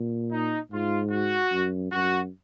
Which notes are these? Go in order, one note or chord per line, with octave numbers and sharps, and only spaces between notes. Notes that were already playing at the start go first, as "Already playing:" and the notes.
Already playing: A#2
D#4
G#2 F4
F#4
F#2
F#2 F#4